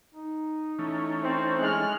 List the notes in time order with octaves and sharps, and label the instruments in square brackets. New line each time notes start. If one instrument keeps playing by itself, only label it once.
[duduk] D#4
[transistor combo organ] E3 A3 C#4
[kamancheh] C4 [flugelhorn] C5
[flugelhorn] G#3 [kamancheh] F6 F#6